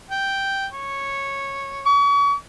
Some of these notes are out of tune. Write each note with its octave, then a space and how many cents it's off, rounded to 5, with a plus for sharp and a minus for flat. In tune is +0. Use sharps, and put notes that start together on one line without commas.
G5 -5
C#5 -10
C#6 +40